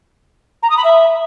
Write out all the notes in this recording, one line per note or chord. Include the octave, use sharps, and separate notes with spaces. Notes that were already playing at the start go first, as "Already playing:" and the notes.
A#5
D#6
B5
E5